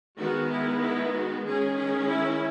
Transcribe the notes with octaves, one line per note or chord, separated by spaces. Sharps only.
D#3 G#3 B3 F#4
E4
E4
F#4
D#3 G#3 C#4 G#4
G#4
E4